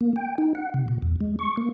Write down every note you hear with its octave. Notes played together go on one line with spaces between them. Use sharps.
A#3
G5
D#4
F#5
C3
A#2
E2
G#3
C#6
A#3